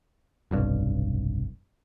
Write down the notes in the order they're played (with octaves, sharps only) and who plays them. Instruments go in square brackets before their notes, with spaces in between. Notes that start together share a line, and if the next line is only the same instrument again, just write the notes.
[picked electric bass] F1 B1 G2